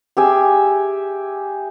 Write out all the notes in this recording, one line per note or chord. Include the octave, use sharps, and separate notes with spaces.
G4 G#4 E5 G#5